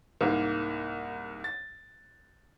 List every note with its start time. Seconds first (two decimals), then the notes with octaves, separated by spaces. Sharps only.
0.21 C2 G#2 A#3
1.44 A6